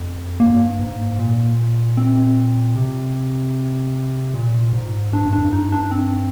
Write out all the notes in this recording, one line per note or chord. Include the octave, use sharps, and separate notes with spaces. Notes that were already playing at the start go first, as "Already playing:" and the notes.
Already playing: F2
G2 A#3
G#2
A#2
C4
C3
A#2
G#2
G#2 D4
G2
D4
F2
G2 D#4
D4
D4
C4